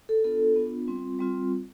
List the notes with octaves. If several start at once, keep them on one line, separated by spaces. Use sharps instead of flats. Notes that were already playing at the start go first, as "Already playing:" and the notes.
A4
B3 D4 F4 A4
B3 D4 F4
G3 C4 F4
G3 C4 F4